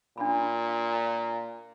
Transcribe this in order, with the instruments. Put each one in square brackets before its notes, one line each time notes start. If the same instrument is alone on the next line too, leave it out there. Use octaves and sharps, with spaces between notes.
[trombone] A#2 [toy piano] D4 B5